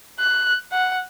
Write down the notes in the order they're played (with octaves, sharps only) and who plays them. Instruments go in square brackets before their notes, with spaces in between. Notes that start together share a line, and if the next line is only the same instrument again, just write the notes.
[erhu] F#6
F#5